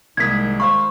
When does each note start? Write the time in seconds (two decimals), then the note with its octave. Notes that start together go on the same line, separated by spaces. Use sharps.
0.17 C2 D#3 G#3 A#3 D#6 G#6 B6
0.60 C5 F5 B5 C#6